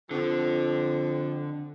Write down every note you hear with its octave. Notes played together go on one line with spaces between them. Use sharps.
F2 D3